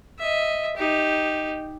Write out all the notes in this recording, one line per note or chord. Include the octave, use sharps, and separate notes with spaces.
D#5 E5
D#4 G4